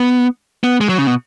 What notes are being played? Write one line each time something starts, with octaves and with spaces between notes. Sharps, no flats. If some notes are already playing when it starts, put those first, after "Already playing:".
Already playing: B3
B3
G#3
F#3
C#3
B2